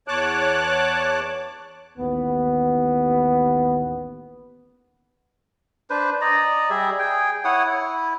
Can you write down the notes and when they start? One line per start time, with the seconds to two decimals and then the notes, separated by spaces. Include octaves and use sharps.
0.08 E2 C#5 A5 D6 F#6
1.98 A1 D#2 B3
5.90 D4 B4 C5
6.21 D5 D#5 A#5
6.70 G3 G#4 E5
6.99 G#4 G5
7.45 E4 C#5 F#5 D#6
7.66 E4